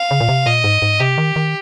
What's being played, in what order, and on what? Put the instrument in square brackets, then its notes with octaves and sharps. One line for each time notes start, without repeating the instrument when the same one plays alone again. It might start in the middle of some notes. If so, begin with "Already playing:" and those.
Already playing: [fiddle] F5
[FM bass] C#3
A#2
C3
[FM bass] A#2 [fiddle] D#5
[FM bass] G#2
G#2
[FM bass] C3 [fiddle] G4
[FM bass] D#3
D#3